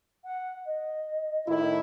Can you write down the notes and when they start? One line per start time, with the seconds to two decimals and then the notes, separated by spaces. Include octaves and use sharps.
0.24 F#5
0.65 D#5
1.48 A2 D#3 E4